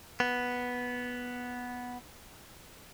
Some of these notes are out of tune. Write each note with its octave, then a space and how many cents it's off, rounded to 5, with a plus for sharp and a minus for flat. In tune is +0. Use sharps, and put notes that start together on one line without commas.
B3 -5